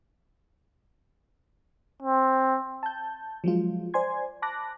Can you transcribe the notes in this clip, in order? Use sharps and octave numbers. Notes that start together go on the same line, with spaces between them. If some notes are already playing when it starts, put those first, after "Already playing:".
C4
A5 G6
F3 F#3 G#3 F4
C5 D5 G#5 C6 G#6
A5 B5 D6 F#6 A#6